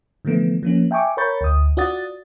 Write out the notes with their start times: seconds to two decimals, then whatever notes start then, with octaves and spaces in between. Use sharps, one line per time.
0.25 D3 E3 F3 A3 B3
0.63 F3 A#3 C#4
0.91 E5 G5 G#5 C#6 D6
1.17 A#4 C#5 B5 C#6 G6 A6
1.41 D2 D#6
1.77 F4 F#4 D5 F#5 D#6 A6